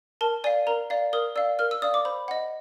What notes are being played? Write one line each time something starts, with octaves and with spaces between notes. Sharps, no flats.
A#4 A5
D5 F5 G#5
A#4 A#5
D5 F5
A#4 D#6
D5 F5 E6
A#4 F6
E6
D5 F5 D#6
D6
C5 B5
D#5 F#5